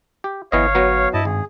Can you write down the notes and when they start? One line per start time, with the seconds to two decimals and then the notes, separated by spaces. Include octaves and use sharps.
0.24 G4
0.52 G1 E3 B3 C#5 D#5 F5
0.75 F#3 B3 F#4
1.14 G2 E4 D#5 A5
1.25 G#1 G#4